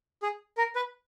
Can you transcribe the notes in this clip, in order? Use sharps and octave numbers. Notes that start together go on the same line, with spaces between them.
G#4
A#4
B4